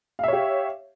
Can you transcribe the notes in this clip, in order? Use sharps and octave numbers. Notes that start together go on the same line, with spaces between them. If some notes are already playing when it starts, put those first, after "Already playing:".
G4 C#5 E5 F5